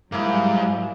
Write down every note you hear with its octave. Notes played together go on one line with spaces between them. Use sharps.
G#2 F#3 G3 A#3 E4